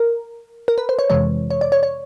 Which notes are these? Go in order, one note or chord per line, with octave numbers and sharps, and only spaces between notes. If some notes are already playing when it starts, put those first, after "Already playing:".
Already playing: A#4
A#4
B4
C5
C#5
F2 C3 E3 G#3 C#5
C#5
D5
C#5
C#5